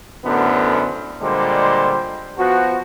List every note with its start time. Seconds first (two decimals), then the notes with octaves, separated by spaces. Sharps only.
0.25 F#2 A2 D3 B3 C5
1.22 A#2 D3 G3 G#3 C5
2.38 F3 B3 F#4